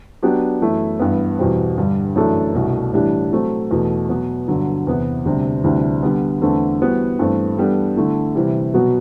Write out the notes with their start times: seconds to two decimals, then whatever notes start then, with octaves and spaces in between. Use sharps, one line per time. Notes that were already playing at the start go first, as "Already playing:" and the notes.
0.23 F#3 B3 D4 G4
0.61 F#2 E3 A3 E4
1.00 G2 E3 B3
1.38 E2 B2 G3 C4
1.78 G2 D3 G3
2.16 F#2 E3 A3 D4 A4
2.55 C2 B2 A3 D4
2.93 A2 E3 G3 D4 G4
3.32 F#3 A3 C4
3.71 E2 B2 A3
4.09 B2 F#3 B3
4.48 G2 D3 F#3
4.87 E2 C3 E3 B3
5.25 D2 C3 G3 D4
5.64 D2 C3 E3 G3 D4
6.03 D3 G3 B3
6.42 E2 D3 A3 C4 E4
6.80 E3 G3 B3 F#4 C5
7.19 G2 E3 A3 C4
7.57 E3 G3 B3 D4 A4
7.96 D3 A3 E4
8.35 C3 E3 G3
8.74 B2 F#3 B3 F#4